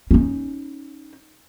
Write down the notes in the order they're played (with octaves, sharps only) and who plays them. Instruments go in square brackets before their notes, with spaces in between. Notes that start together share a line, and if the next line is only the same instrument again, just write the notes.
[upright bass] C#4 D#4